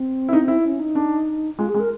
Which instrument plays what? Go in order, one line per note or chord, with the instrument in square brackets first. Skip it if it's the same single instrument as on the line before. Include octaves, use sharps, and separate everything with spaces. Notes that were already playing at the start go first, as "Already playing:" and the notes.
Already playing: [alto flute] C4
[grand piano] E4
D#4
E4
[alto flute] C#4
D#4
[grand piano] D4
[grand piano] G#3 [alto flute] F4
[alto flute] G#4
[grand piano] G#3
[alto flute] A#4